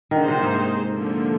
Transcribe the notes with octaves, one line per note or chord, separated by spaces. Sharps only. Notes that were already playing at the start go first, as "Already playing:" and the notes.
D#3
D3 A#3 D#4 G#4 C5
C3
G#2
D3 F3 A#3